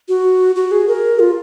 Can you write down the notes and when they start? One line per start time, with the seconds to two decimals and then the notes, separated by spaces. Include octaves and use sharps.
0.09 F#4
0.56 F#4
0.71 G#4
0.88 A#4
1.19 F4